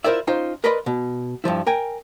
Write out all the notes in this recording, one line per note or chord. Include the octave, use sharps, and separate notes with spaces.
E4 F4 A#4 C5 D5 E5
C#4 D#4 F4 C5
A#4 B4 D5 D#5 B5 C6
B2
G2 A#2 F3 E4
A#4 G5 G#5